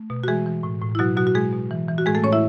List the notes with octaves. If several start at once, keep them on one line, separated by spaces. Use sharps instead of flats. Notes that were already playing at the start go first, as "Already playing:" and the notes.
Already playing: A3
B2
F#4
E3 G#3 G#4
E3
A2
A2
E4
B2 F#3 F#4
B2 F#3 F#4
F#4
B2 G#3 G#4
B2
E3
E3
F#4
A2 G#3 G#4
A3 A4
A2 C#4 C#5
E4 E5